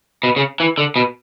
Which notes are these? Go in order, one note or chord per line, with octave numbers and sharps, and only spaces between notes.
B2
C#3
E3
D3
B2